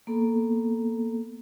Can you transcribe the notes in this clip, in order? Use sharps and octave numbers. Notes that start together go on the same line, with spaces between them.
A#3 B3 A4